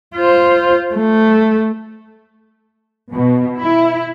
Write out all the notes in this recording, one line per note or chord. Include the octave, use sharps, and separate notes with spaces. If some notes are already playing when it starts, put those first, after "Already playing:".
F4 C5
A3
B2
E4